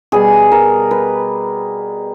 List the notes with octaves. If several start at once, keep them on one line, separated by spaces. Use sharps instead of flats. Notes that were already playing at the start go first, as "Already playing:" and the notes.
B2 G3 G#4
A#4
B4